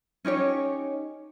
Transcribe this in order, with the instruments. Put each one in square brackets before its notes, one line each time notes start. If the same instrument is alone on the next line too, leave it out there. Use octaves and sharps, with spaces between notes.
[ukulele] C#4 D#4 G4 C#5